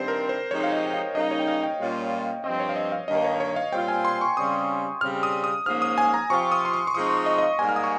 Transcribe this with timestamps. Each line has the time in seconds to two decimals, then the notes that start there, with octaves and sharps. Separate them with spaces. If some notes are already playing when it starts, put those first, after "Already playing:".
Already playing: G2 D#3 G3 C4 C5
0.08 A#4
0.29 C5
0.51 C3 F3 G#3 D#4 C#5
0.63 F5
0.72 D#5
0.86 G5
0.94 F5
1.15 C#3 G3 A#3 D#4 D#5
1.31 C#5
1.39 G5
1.47 F5
1.63 G5
1.80 A#2 G3 A#3 C#4 F4
2.44 G2 F3 C4 D#5
2.60 C#5
2.69 F5
2.76 D#5
2.92 F5
3.08 G2 D#3 A#3 D#5
3.24 C#5
3.40 C#5
3.56 F5
3.72 A#2 G3 C4 F4 G5
3.88 G#5
4.05 C6
4.21 C#6
4.36 C#3 G3 C4 D#6
5.01 C#3 G3 C4 F6
5.23 D#6
5.44 D#6
5.65 G#2 F3 A#3 C#4 F6
5.82 D#6
5.98 G#5
6.14 A#5
6.30 C3 F3 C4 F4 C#6
6.52 D#6
6.65 C6
6.74 C#6
6.87 C#6
6.94 F3 G#3 C4 D#4 D#6
7.11 C#6
7.26 D#5
7.38 D#5
7.42 F5
7.59 G#2 G3 A#3 G#5
7.69 F6
7.76 D#6
7.84 C#6